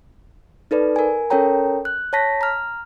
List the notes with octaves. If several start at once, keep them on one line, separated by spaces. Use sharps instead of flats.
D#4 A4 B4 D5
A#4 G#5
C#4 A4 A#4 C#5 G5 A#5
F#6
C#5 A5 A#6 B6
A#5 F6